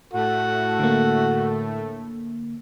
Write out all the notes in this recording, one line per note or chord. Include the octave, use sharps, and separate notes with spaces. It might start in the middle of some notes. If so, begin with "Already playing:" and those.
A2 A3 F#4 A4
D3 A#3